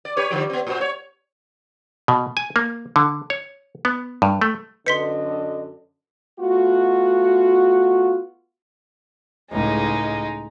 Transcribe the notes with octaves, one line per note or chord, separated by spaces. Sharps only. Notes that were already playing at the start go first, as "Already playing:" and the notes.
D5
G4 B4 C#5
D3 F3 G3
B3 C4
A2 F#4 C5
C#5
B2
G#5
A#3
D3
C#5
B3
G2
A3
F#2 D3 B4 D#5 C6 B6 C#7
A3 B3 F4 F#4
C#2 A2 G#3 D#4